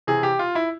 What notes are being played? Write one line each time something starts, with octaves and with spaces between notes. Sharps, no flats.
C3 E3 G#4
G4
F4
E4